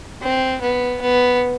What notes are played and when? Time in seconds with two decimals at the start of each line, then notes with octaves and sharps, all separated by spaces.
0.22 C4
0.61 B3
1.01 B3